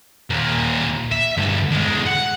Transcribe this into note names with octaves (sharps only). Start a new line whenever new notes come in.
D#2 A#2
E5
D2 G2
B1 G#3
F#5